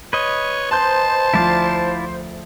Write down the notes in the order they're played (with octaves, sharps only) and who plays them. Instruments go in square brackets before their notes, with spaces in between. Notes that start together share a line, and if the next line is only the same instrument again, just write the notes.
[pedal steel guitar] B4 D#5 [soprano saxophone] C#5
[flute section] C5 [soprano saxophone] A5 [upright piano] C6 G6
[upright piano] D2 F3 [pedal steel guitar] E4 D5 F5